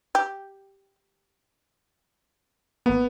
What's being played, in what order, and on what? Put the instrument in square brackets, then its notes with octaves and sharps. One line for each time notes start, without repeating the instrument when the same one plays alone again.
[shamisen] G4
[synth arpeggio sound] G#1 A#3 [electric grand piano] B3